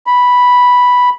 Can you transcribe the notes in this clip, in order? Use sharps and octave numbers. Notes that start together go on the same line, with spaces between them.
B5